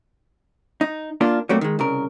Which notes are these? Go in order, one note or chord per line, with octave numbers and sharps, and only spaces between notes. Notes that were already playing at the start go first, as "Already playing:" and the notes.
D#4
A#3 D4 F4
F#3 G3 A3 A#3 C4
D#3 G#3
C2 C#3 A#4